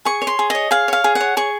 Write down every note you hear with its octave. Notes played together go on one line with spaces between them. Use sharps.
G#4 C#6
C#5
C6
G#4
C#5 D#5
G#4 F5
C#5 F5
G#4
F#5
C#5
G#4 C#6